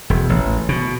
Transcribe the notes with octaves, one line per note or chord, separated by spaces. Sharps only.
E1
A1
B2